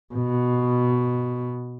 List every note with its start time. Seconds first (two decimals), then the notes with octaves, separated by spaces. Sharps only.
0.14 B2